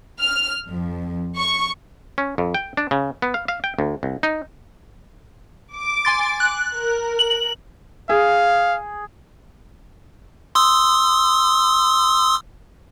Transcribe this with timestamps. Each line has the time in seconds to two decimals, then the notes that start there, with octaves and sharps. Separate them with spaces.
0.20 F6
0.67 F2
1.37 C#6
2.18 C#4
2.38 F2
2.54 G5
2.77 D4
2.91 C#3
3.22 B3
3.34 F5
3.48 F5
3.64 G5
3.79 D2
4.03 C2
4.23 D#4
5.74 D6
6.05 G#5 C6 A6
6.40 F#6
6.75 A#4
7.19 F#7
8.09 G#4 F5
10.55 C6 D#6 E6